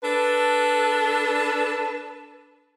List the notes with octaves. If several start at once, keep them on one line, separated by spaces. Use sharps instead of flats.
D4 A4 B4